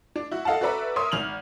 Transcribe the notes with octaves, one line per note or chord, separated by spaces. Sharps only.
D4
E4 F#4
A4 D#5 F5 F#5 A5
F#4 A4 B4 D5 E5 A#5
A#4 C#5 E5 C6 D#6
G#1 F6 F7 F#7